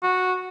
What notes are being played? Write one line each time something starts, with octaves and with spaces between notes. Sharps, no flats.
F#4